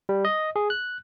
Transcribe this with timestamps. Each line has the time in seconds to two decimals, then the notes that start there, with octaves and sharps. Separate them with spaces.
0.09 G3
0.25 D#5
0.56 G#4
0.70 F#6